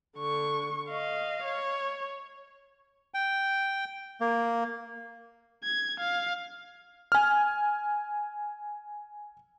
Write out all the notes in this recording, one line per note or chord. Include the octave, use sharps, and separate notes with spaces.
D3 C#6
D#5 F5
C#5
G5
A#3
G#6
F5
G#5 F6